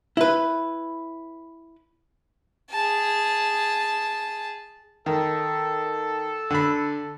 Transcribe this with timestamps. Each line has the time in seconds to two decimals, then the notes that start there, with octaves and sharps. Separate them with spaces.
0.17 E4 B4
2.70 G#4 A5
5.06 D#3 A4
6.50 D3 B5